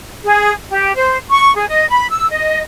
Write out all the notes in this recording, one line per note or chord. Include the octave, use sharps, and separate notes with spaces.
G#4
G4
C5
C#6
G#4
D#5
B5
E6
D#5